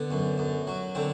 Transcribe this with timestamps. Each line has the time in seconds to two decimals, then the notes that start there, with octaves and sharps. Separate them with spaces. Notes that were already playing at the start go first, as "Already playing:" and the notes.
Already playing: D3 B3
0.11 F#2
0.38 F#2
0.67 F#3
0.95 D3 C4